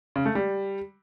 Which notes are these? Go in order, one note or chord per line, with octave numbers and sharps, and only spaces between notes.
C#3
A3
G3